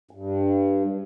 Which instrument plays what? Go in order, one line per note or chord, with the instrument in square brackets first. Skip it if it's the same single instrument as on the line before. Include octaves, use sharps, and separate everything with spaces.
[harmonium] G2